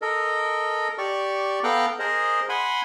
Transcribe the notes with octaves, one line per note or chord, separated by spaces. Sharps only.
A4 A#4 D#5
G4 D5 C#6
B3 A4 F5 G5 A#5 F#6
G#4 A#4 C5 D#5
F#5 G#5 B5 C6